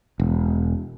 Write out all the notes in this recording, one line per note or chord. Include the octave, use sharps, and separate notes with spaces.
E1